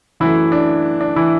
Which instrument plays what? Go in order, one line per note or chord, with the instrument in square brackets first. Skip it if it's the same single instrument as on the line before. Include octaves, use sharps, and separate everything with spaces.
[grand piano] F#2 E3 F#3 A3 E4
D4
D4
E3 E4